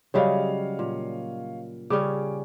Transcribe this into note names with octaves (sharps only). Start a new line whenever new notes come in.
C#3 F#3 G3 C#5 D#5 F5
A#2
C#3 G3 C#4 D6